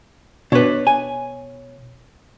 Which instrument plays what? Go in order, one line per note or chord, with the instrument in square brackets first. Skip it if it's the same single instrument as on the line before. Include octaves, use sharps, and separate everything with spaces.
[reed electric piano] B2 C#5 [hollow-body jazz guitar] D4 B4
[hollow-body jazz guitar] G#5